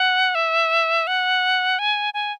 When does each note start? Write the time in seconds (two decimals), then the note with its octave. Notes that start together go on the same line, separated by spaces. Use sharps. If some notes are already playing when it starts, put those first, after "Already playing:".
Already playing: F#5
0.35 E5
1.07 F#5
1.79 G#5
2.14 G#5